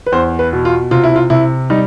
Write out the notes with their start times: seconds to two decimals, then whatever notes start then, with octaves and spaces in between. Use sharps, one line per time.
0.07 B4
0.12 E2 C5
0.39 B4
0.53 B2
0.65 F4
0.91 C3 F4
1.04 E4
1.16 F4
1.30 C3 E4
1.70 G3 D#4